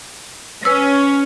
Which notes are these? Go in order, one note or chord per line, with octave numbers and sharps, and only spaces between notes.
C#4 B4 E6